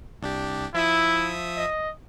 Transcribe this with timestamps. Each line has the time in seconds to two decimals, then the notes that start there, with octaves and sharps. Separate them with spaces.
0.22 C2 D4 G4
0.74 F3 E4 E5 D#6
1.57 D#5